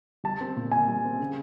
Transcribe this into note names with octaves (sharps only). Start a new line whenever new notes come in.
G3 A5
C4
A#2
A#2 G#5
G3
C4
C#3